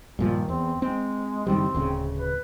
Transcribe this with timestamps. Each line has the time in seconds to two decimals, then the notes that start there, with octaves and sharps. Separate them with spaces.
0.19 G2 A#2 D#3 F3
0.49 E2 C4
0.82 G#3 C4
1.47 F#1 D#3 G3 C4
1.74 D1 D2 C#3
2.18 B4